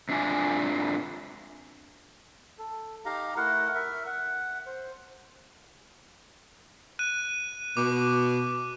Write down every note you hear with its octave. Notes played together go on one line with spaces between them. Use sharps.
G#2 C4 D4 F4 E5 G#5
A4
D#4 G4 F5 A#5
A3 E4 A#4 F#5
A#4 E5
F#5
C5
F#6 D#7
B2 D6